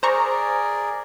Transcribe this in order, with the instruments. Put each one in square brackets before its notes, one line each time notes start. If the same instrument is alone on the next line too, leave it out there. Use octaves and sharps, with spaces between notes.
[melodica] G#4 A#4 D5 [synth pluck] C5 A#5 C#6